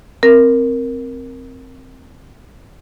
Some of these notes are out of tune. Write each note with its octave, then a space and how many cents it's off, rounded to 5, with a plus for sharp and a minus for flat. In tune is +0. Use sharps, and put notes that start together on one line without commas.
C4 +0 A#4 +0